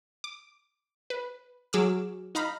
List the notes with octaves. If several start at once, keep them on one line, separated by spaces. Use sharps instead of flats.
D6
B4
F#3 G#4 D6 E6 F6
D#4 F5 A#5 B5